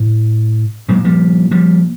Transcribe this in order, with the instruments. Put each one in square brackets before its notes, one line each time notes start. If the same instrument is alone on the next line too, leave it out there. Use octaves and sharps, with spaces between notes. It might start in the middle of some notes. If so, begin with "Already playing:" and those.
Already playing: [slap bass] A2
A#2 F#3 G#3
F3 G3
F3 G3